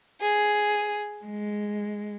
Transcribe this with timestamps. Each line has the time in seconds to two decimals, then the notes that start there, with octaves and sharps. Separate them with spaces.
0.20 G#4
1.26 G#3